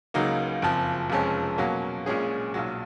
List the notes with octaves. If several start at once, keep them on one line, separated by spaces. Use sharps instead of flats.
C#2 C#3 F#3 A#3 D#4
F#1 F2 F3
F1 F2 F3 G#3 C#4
B2 F#3 A#3 C#4
A#1 A#2 G#3 C#4 G#4
B1 A#2 F#3